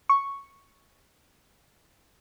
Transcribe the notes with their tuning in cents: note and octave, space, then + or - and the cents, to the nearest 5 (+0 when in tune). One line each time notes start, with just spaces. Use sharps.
C#6 +0